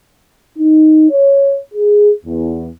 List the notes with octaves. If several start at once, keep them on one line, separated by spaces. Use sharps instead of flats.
D#4
C#5
G#4
E2